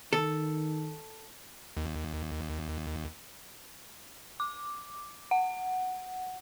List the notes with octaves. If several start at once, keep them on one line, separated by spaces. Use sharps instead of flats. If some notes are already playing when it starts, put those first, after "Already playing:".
D#3 A4
D#2
D6
F#5